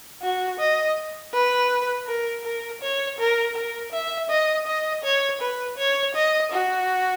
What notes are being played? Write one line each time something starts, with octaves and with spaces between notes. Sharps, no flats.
F#4
D#5
B4
A#4
A#4
C#5
A#4
A#4
E5
D#5
D#5
C#5
B4
C#5
D#5
F#4